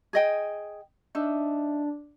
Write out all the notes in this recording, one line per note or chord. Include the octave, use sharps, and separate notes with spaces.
G#4 D#5 G5
D4 D#4 E5